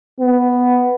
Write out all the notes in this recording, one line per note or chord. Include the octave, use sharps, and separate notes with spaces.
B3